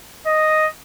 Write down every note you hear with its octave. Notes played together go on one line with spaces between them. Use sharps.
D#5